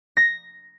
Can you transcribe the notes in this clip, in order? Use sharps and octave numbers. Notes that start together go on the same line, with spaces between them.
A#6